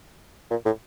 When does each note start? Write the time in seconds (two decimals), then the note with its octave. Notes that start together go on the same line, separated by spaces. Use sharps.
0.51 A#2
0.66 A2